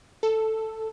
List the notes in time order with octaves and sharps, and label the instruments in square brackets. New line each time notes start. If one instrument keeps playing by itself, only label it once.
[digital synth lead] A4